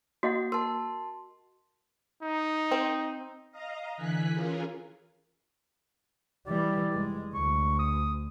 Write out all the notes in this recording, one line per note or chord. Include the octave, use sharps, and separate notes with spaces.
A#3 F#4 D#5 F#5
A#4 A5 C6
D#4
C4
D#5 F5 A#5
D3 E3 G#5 F#6 B6
E3 C#4 F4 G#4 A#4
E3 G3 D5
F1 G#3
D2 C#6
D#6